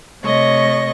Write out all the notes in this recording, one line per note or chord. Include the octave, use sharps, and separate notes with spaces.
C3 A3 C#5 D#5 C#6 A#6